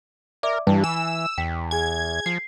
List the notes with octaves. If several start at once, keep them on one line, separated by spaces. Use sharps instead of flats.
A#4 D5 E5 D6
G2 E3 E4 A5
G#5 E6
E2 G5 B6
G#4 G#5 G#6
F3 C7